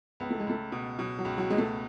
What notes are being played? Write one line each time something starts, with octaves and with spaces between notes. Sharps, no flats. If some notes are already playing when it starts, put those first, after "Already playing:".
C#2 B3
A3
G#3
C#2 A3
B2
B2 F#3
F#3
C#2
F#3
B2 G#3
A3